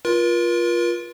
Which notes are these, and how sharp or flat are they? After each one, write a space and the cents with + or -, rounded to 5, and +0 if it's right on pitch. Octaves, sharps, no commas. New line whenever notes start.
F4 +0 A#4 +45